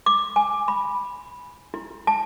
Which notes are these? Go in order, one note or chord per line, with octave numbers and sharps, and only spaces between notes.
D6
G#5
B5
E4
A5